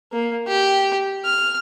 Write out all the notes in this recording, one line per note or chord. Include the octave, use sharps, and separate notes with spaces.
A#3
G4
F6